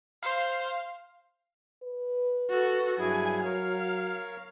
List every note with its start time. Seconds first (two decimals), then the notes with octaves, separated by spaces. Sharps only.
0.23 C5 F5
1.83 B4
2.50 F#4 A4
2.99 G2 F#3 E4 G#4 G#5
3.45 A#4 C#5 F5